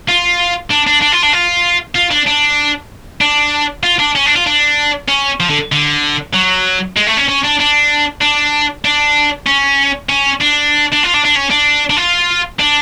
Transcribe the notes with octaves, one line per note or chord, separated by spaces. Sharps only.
F4
D4
D4
D4
F4
D4
F4
F4
D4
D4
D4
F4
D4
C#4
D4
F4
D4
C#4
F3
D3
D3
F#3
G#3
A3
C#4
C#4
D4
D4
D4
D4
C#4
C#4
D4
D4
F4
D4
D4
C#4
D4
D4
F4
D4